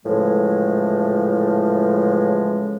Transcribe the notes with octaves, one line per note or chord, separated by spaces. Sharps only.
A2 C#3 E3 F3 G#3